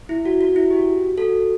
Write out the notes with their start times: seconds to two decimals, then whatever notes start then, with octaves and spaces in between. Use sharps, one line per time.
0.09 E4
0.25 F#4
0.41 F#4
0.56 E4
0.71 G4
0.77 F#4
1.18 F#4 A4